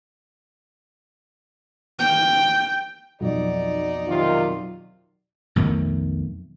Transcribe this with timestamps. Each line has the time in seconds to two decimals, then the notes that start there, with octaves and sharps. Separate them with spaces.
1.99 G5
3.20 B1 F2 D#4 D5
4.07 C3 D#3 F4
5.56 B1 F2 D#3 A3